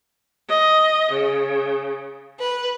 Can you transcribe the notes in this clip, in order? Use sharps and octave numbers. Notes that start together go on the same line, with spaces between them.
D#5
C#3
B4